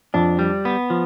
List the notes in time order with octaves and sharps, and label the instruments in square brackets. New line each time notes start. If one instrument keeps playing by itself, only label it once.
[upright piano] F2 [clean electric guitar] D4
[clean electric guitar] G3
B3
F3